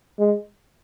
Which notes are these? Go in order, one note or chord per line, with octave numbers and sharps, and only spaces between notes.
G#3